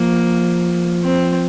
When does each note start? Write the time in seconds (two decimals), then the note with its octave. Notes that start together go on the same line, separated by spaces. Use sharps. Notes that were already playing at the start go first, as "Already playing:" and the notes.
Already playing: F3 A#3
1.04 C4